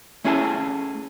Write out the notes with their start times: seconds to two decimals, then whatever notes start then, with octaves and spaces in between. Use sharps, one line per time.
0.24 A3 C#4 E4 G#4 G#5 A5